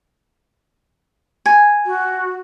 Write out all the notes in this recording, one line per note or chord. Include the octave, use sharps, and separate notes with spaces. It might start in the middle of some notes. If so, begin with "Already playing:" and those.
G#5
F#4